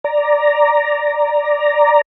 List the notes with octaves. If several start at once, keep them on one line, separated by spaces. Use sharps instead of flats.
D5 A#5